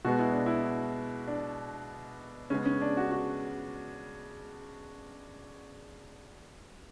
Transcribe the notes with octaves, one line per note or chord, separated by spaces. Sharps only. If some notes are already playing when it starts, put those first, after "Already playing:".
B2 G#3 B3 F#4
E4
D4
E4
D4
C#3 G#3 B3 C#4
C#4
D4
F#4
F#4